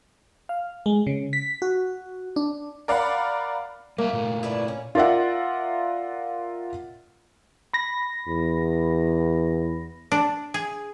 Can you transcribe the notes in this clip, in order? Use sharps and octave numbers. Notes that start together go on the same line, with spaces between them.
F5
G#3
C#3
B6
F#4
D4
A#4 D5 F5 F#5 A#5 B5
G3 A#3 E5
A#2 A3
E4 B4 D5
C#4
F4 A#4 D5 E5 F#5
B5 A#6
E2
D4
G#4